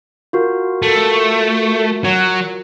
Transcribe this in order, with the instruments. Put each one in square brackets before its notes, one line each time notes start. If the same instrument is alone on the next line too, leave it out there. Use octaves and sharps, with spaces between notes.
[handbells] F4 F#4 A#4
[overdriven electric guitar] A3
F#3